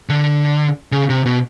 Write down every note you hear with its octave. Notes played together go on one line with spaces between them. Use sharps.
D3
C#3
C3
B2